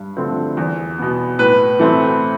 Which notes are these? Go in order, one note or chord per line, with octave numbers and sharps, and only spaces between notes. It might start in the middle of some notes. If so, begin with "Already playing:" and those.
Already playing: G2
D3 F3 A3 C4
E2
B2 B3
A2 B4
E3 A3 C4